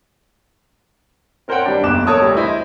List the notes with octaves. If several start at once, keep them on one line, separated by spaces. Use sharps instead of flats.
C4 A#4 C5 C#5 F#5 G5
G3 D4
F#1 B1 E2 D6 F#6 E7
A4 A#4 C#5 A5 D#6 E6
D2 G3
E4 C5 D#5 E5